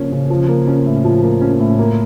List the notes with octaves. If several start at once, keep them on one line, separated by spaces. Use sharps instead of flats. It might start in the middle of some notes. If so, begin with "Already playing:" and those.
Already playing: C#3 F3 A#3 C#4
C#3
F3
A#3
C#4
A2
F3
A#3
C#4
A2
A#3